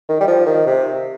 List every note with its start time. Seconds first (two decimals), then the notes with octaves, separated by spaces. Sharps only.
0.09 D#3
0.21 G3
0.27 F3
0.46 D#3
0.66 C3